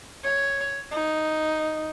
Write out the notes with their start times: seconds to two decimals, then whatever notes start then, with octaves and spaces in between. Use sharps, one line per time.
0.24 C#5
0.91 D#4